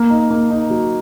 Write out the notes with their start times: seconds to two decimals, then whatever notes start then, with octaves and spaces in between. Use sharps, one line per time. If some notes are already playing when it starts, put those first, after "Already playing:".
Already playing: A#3
0.10 D#4
0.31 A#3
0.50 D#4
0.70 F#3